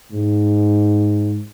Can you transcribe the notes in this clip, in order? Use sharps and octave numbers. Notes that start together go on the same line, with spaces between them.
G#2